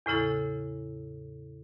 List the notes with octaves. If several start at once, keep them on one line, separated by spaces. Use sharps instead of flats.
E2 A2 C#3 E4 A4